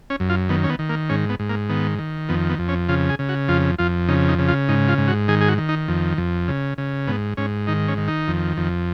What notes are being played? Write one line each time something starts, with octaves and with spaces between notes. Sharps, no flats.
C#4
F#2
F4
D#3 B3
C#4
B3
D#3
A#3
G#2 C#4
B3
G#2
A#3
D#3 B3
D#3
F2 B3
B3
F2
C#4
C#3 F4
G#4
C#3
F#4
F2 F4
F2 F4
C#3 D#4
D#4
C#3
F4
G#2 D#4
F4
G#2
F#4
D#3 G#4
G#4
F#4
D#3
D#4
F2
F2
C#3
C#3
G#2 B3
G#2 C#4
D#3 D#4
C#4
D#3
D#4
F2
F2